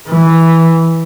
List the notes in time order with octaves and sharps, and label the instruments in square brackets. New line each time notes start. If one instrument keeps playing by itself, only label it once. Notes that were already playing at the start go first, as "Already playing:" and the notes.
[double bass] E3